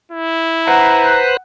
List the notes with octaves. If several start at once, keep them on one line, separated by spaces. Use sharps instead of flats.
E4
B4 C5 F#5 A#5 F#6